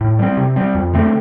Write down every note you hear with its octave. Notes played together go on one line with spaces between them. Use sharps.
A2
G3 C4
C3
G3 C4
F2
D3 A3 C4